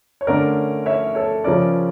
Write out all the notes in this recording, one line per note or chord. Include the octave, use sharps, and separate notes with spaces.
C#5
D3 A3 C#4 A#4 D5
C#5 E5
A4 C#5
C#3 F3 C#4 A#4 D5